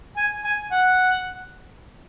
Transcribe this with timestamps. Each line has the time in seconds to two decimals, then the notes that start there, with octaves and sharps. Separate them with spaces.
0.17 G#5
0.45 G#5
0.71 F#5